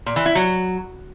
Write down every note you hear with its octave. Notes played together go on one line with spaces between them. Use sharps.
A#2
E3
E4
F#3